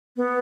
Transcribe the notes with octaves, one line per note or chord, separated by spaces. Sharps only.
B3